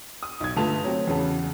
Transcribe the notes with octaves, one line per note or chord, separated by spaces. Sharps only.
D#6
B1 G#6
G1 A3 F4 B4 A5 F7
F#3 C4
E2 C#3 A5